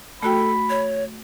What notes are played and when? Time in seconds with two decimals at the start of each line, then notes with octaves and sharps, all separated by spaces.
0.23 A3 F#4 A4 G5 B5
0.70 C#5